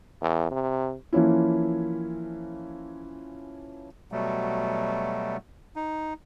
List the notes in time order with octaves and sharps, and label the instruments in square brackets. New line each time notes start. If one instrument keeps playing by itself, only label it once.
[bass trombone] E2
C3
[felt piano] E3 F3 A#3 C#4 E4
[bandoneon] B2 F#3 G3 A3
D#4